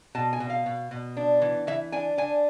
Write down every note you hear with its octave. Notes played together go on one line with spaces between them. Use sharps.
B2 A5
G#5
B2
F5
B2
B2
D4
E3
E3 E5
D4 G#5
D4 G#5